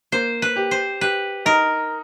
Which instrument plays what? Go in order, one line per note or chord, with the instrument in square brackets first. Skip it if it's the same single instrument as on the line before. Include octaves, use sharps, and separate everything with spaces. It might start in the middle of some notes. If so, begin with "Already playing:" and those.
[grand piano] A#3 [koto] C5
[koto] B4
[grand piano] G4
[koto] C5
[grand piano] G4 [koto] B4
[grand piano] D#4 [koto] A#4